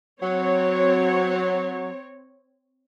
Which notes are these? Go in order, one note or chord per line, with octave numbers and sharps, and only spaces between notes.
F#3 C4 C#5